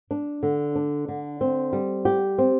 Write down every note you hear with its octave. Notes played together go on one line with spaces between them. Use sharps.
D4
D3
D4
D3
C4
G3
G4
C4